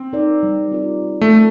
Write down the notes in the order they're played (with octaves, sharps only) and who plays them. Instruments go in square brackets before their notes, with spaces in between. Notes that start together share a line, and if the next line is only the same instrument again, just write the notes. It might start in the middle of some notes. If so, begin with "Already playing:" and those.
Already playing: [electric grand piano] C4
[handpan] D#4 A#4 D5
G3
C4 F4 A#4 D5
G3
[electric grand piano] A3
[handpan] C4 F4 A#4